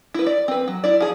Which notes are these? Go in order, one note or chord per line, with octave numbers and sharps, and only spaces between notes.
E4 B4
D5
C4 B4
F#3
E4 D5
F3 G#4